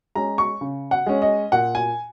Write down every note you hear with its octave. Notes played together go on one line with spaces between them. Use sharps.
G#3 C#4 A#5
C#6
C#3
F#5
G#3 C#4
D#5
A#2 F#5
G#5